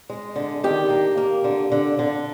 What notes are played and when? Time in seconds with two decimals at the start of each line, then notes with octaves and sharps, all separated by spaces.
0.09 G#3
0.36 D3
0.64 D#3 G4
0.90 A#3
1.17 A#3
1.44 D3
1.72 D3
1.99 D3